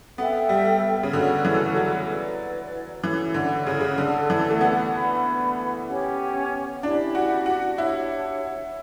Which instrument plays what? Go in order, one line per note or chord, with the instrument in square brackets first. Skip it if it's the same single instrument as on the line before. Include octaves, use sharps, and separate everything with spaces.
[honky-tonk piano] B3 [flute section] A4 E5 G5
[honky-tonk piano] G3
C#3
[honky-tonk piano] D3 [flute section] C#4 F#4 A4
[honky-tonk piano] E3
F#3
[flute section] E4 B4 D5
[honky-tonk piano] E3 [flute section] C#4 E4 A4 C#5
[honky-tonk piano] D3
C#3
C#3
[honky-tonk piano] D3 [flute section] A4 D5 A5
[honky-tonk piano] E3
A3
B3
[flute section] B4 F#5 B5
C#4 G4 C#5
[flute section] C#4 E4 G4 [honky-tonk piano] D4
[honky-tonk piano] F#4
F#4
[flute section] D4 G4 C#5 F#5 [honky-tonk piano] E4